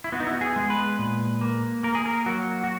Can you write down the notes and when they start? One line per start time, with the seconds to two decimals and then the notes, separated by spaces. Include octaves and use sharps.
0.04 E4
0.12 B3 F#4
0.20 D#4
0.27 E4
0.34 F#4
0.41 G#4
0.56 G#3
0.70 B4
0.99 A#2
1.41 A#3
1.83 A#3 A#4
1.95 G#4
2.06 A#4
2.26 F#3 F#4
2.64 F#4